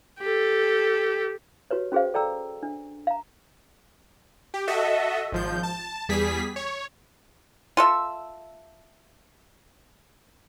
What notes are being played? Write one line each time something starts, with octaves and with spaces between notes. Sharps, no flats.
G4 A4
F#4 G4 B4 C#5
C#4 F#4 G#4 C5 F5
A4 D5 G5 A#5 E6
D4
F5 A#5
G4
F#4 A4 D#5 E5
G#1 F3 G6
A5
E2 G3 G#4 B6
C#5
F4 A4 E5